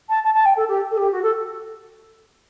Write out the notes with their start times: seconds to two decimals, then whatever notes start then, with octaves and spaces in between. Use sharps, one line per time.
0.09 A5
0.23 A5
0.34 A5
0.45 G5
0.56 A4
0.68 G4
0.91 A4
0.97 G4
1.11 F#4
1.22 A4